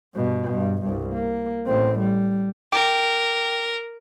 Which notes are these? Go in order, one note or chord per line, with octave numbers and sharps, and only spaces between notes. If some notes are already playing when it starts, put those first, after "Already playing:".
G2 B2
G2
C2 G2
A#3
A1 C4
G3
A#4 G5 D6